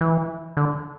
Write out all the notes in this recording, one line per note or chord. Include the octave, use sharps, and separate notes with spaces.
E3
D3